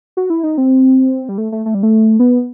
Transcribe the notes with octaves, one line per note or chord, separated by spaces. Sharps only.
F#4
E4
D#4
C4
G3
A3
A3
A3
G3
A3
B3